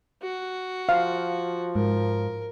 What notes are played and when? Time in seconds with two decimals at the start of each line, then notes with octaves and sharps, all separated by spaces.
0.22 F#4
0.89 F3 F5
1.75 G#2 A#4